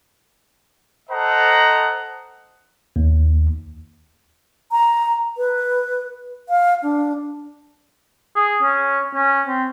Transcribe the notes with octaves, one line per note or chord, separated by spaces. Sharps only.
A4 C5 D#5 F#5 A5 A#5
D#2
A#5
B4
F5
D4
G#4
C#4
C#4
C4